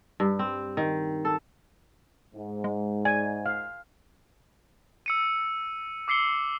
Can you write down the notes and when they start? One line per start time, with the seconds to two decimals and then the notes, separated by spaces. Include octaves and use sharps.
0.20 G2
0.39 C4
0.77 D#3
1.25 A4
2.35 G#2
2.64 G#3
3.05 D5 G#5
3.46 F5
5.06 E6 C#7 D#7
6.08 D6 E6 C7 C#7 G7